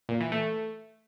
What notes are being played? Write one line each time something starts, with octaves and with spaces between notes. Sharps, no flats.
A#2
E3
A3